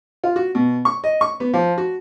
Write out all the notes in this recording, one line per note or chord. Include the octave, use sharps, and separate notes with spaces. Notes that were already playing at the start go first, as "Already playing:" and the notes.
F4
F#4
B2
C#6
D#5
C#6
B3
F3
F#4